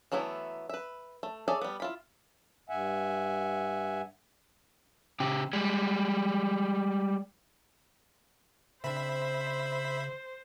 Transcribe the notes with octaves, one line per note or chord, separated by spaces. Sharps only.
E3 F#3 A3 B3 E4
B4 E5
A3
G#4 A4 C#5 D5 E5
G3 B3
E4 F4 B5
G2 E5 F#5 G#5
C#3 G4
G3 G#3
C#3 C4 D4 C5 E5 B5